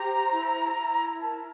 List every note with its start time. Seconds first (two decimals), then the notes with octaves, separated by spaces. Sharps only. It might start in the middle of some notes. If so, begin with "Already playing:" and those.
Already playing: G4 C5 A#5
0.31 E4
0.76 E4
1.12 A#5
1.21 A#4 A5